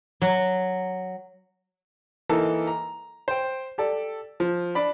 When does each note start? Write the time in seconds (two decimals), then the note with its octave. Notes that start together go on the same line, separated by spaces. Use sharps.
0.22 F#3
2.29 E3 A#3 D#4 A4 A#4
2.67 A#5
3.28 C5 G5
3.78 G4 A4 D5
4.40 F3
4.75 D4 D5 B5